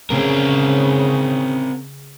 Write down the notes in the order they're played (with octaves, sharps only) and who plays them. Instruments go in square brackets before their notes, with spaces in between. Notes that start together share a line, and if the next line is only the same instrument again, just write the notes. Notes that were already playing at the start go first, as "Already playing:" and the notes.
[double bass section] C#3 [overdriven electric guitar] C4 A#4